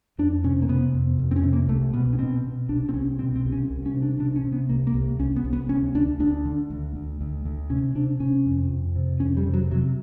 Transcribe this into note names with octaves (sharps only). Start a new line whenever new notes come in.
F2 D4
C3 C#4
A#3
C3 B3
F2
F2
C4
C#4
C3
A#3
C2 A3
B2 B3
C#4
B2 C4
B2
C2 D4
C4
C2 C#4
B2 C4
C4
C2
C#4
C2
C#4
C3
D4
C3 D4
C#4
C3
B3
C2 A#3
A#3
C2
C2 C#4
B3
C2
B3
D2 C#4
D2 D4
D2 D4
D3
D2
D2
D2
D2
C3 C#4
C3 D4
C3 C#4
F2
F2
C3
F2 C#4
G3
C3
F#3
C3 F#3